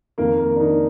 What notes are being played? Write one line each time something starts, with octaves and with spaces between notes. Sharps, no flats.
F2 D#3 A#3 A#4
A#3 A#4
D4
D#3 D#4